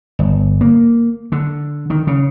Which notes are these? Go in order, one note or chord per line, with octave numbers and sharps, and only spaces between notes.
G1
A#3
D3
D#3
C#3